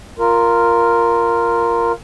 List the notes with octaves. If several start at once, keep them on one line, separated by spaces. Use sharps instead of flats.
F4 A#4